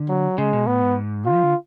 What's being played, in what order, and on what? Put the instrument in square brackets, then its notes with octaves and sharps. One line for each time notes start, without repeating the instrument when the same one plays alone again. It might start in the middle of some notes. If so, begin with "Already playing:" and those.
Already playing: [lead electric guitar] D3
[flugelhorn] F#3
[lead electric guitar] C#3 [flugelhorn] G#3
[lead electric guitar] B2
[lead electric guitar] A2 [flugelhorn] B3
[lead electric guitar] G#2
[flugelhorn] F4
[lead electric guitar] F3
D3